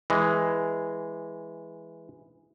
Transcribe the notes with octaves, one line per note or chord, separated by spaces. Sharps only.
E3 G#3